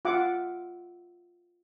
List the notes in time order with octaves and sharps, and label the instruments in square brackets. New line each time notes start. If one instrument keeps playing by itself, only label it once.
[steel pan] F4 E5 F#5 D6